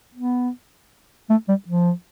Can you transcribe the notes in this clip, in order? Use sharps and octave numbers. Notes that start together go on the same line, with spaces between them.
B3
A3
G3
F3